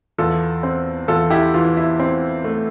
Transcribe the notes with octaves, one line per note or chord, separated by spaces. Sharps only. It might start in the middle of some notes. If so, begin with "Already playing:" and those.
E2 F4 A4
C4
E2 F4 A4
E4 G4
E3 F4
E4
C4
A3